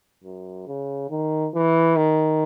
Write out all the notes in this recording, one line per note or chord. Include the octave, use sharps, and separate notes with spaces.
F#2
C#3
D#3
E3
D#3